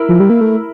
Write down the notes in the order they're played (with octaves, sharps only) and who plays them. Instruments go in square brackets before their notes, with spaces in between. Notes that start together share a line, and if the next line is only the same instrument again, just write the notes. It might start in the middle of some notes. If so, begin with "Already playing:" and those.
Already playing: [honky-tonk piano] E4 A#4
[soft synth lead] F3
G3
A#3
A3